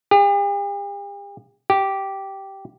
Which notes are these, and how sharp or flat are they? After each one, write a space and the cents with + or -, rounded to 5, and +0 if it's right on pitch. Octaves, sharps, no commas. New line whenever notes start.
G4 +45
G4 -10